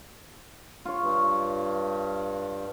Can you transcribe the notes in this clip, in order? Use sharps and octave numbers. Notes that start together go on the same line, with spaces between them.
F4 C#5
G2